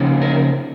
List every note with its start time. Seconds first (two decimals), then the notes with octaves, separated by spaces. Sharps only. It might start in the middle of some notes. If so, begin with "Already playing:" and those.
Already playing: C#3 F3 A#3 D#4
0.22 A#4